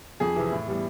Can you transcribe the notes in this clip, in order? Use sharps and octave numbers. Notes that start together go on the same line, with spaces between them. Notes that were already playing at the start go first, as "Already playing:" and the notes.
F2 G#4
C3 E3
A2
E3 G3 B3